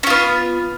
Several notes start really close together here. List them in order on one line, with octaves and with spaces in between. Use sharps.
C#4 F4 B3